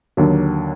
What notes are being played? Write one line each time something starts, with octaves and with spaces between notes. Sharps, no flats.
D#2 D3 F#3